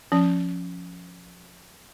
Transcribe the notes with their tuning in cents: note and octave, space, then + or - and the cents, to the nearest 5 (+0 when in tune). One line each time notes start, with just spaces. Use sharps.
F3 +15 C#4 +0